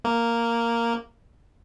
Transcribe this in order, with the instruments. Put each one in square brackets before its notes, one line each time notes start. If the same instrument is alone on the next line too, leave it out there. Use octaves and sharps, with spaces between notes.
[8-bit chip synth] A#3